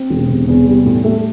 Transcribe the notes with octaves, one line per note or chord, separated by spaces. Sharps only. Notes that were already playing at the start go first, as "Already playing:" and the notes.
Already playing: C4
E1
C3
E2
G3
A2
A3